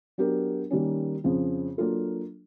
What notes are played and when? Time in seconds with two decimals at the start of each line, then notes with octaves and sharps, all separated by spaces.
0.18 F#3 B3 D4 G4 A#4
0.71 D#3 G3 A#3 C#4
1.24 F2 C#3 F3
1.78 F#3 A#3 D4 F4 A4